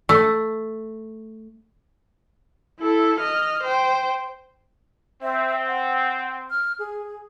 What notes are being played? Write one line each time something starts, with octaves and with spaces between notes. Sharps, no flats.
A3
E4 A4
D#5 F6
C5 G5
C4 E5
F#5
F6
G#4